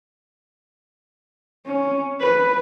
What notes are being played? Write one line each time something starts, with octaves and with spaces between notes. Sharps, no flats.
C#4
B4